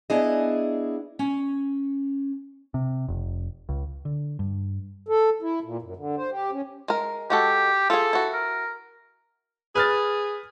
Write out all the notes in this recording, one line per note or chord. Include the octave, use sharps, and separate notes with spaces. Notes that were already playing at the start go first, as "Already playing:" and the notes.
B3 D4 E4 G#4 D#5
C#4
C3
F1
C#2
D3
G2
A4
E4
A#2
F#2
D3
C5
G4
C#4
G#3 A#4
G#3 F#4 G4 A4
F4 G#4 A4
E4 F#4
A#4
G#4 B4 F6 A6